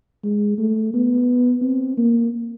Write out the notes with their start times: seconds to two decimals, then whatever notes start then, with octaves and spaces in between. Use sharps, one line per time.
0.24 G#3
0.58 A3
0.94 B3
1.62 C4
1.97 A#3